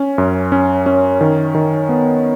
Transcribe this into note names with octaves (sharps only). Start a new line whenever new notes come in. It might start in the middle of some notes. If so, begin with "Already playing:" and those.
Already playing: C#4
F#2
C#4
C#4
D#3
D#3
B3